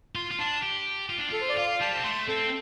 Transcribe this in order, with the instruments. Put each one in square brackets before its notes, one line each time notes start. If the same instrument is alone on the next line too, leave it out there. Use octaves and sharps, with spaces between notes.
[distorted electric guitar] F4 [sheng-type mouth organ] C6
[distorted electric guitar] F4
[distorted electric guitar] D4 [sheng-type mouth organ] A5
[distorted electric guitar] G4
F4
D4
[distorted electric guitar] F4 [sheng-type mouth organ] A4
[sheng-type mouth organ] C5
D5
[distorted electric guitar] F4 [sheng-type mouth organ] F5
[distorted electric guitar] G3 [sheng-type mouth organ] A5
[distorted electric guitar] C4
[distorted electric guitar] A3 [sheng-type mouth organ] C6
[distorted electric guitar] C4 [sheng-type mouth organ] A4